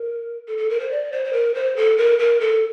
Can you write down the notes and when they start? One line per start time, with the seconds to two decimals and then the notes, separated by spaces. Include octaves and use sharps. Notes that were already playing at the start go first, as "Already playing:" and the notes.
Already playing: A#4
0.48 A4
0.58 A4
0.70 A#4
0.80 C5
0.91 D5
1.12 C5
1.25 C5
1.33 A#4
1.55 C5
1.76 A4
1.98 A#4
2.19 A#4
2.40 A4